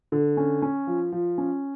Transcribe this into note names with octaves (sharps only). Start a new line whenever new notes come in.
D3
C#4
C#4
F3
F3
C#4